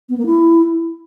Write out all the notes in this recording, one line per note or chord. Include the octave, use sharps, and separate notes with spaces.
B3
A#3
E4